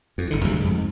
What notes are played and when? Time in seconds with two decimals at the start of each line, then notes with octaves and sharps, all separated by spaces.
0.18 F2
0.30 G1 A2 D3
0.44 D2 C#3 F#3 G3
0.60 F2 G#2